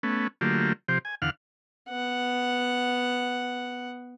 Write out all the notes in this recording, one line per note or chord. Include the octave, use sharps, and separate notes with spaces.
A3 B3 C#4
D3 F#3 A3 A#3 F4 G4
C3 F3 G4 C5
G#5
E2 D3 F5 F#5 F6
B3 F#5